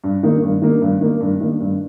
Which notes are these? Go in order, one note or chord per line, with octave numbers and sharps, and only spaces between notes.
G2
D#3 A#3
G2
D#3 A#3
G2
D#3 A#3
G2
D#3 A#3
G2